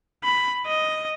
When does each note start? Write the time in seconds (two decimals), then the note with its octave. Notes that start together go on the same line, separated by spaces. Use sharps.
0.24 B5
0.66 D#5